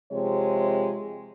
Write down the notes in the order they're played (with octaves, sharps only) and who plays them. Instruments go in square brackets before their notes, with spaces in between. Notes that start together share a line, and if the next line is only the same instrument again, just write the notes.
[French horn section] C3 F3 G#3 C#5